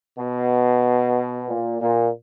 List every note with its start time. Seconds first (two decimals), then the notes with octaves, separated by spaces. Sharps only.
0.19 B2
1.49 A#2
1.81 A#2